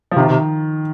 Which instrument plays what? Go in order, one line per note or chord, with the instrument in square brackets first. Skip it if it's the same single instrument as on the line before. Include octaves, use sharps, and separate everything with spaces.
[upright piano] F3
[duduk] C3 [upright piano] D#3
[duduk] C3